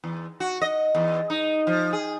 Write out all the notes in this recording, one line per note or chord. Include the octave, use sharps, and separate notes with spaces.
E2
F#4
D#5
E2
D#4
F3
G#4